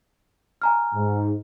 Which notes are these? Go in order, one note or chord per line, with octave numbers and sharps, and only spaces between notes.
G#5 A#5 F6
G#2